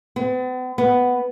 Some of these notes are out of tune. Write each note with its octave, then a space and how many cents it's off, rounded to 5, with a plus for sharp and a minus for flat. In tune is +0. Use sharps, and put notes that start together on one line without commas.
B3 +45
B3 +5